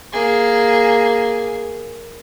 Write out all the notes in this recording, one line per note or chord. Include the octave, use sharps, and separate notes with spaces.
A#3 G#4